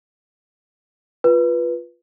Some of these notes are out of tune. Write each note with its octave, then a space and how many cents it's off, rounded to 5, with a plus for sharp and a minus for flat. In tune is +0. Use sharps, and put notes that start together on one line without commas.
F4 +0 B4 -10